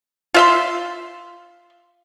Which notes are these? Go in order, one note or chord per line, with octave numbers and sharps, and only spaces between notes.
F4 E5 C6